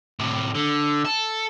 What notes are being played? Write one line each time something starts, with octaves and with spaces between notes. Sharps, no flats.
A2 C3
D3
A4